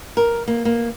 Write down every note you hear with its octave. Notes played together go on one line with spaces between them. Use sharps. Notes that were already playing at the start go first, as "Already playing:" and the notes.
A#4
A#3
A#3